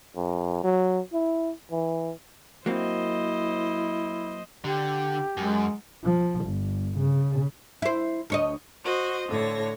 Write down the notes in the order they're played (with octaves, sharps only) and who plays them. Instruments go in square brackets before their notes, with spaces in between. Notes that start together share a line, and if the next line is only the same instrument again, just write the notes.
[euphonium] F2
F#3
E4
E3
[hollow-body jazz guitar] F#3 A#3 C4 [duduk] E4 [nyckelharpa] C5 D#5
[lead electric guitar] D3 [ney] G4
[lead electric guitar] F#2 [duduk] G#3
[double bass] F3
G1
C#3
[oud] E4 C5
D2 C#5 D#5
[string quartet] F#4 C5 D#5
A2 D3 C#5 A#6